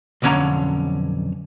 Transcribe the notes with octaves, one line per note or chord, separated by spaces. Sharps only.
B1 F2 D3 C#4 C#5 A#5